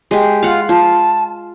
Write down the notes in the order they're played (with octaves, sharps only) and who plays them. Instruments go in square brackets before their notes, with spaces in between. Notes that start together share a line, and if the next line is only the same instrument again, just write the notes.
[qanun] G#3 G4
[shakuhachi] F4 [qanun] F5 F#5
[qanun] F4 [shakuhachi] A5